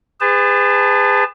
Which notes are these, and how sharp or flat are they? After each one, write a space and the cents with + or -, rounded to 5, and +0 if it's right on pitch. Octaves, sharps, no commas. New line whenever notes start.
G#4 -30 B4 +40 A5 +0